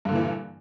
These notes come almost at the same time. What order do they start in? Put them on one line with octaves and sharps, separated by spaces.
G2 D3 A#2 E3